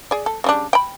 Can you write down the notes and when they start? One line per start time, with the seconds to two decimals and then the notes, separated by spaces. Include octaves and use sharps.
0.11 G#4 D5
0.26 A4
0.44 C#3 G3 D4
0.73 G5 B5